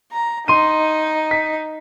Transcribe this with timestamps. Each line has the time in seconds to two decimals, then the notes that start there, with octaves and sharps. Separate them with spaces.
0.12 A#5
0.48 D#4 C6 D#7
1.31 B6